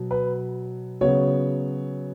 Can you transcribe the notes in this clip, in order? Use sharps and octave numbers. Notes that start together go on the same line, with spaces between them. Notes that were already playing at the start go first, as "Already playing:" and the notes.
Already playing: B2 F#3
B4
C#3 F#3 B3 C#5